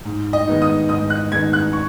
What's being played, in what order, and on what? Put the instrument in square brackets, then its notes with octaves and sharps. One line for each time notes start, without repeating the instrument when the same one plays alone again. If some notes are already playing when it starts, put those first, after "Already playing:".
[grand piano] G#2
D#5
D#3 G#3 B3 D#4
D#6
G#2 D#6
F#6
D#3 G#3 B3 D#4 G#6
F#6
C#6